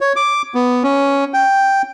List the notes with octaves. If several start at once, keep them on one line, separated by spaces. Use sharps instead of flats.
C#5
D6
B3
C#4
G5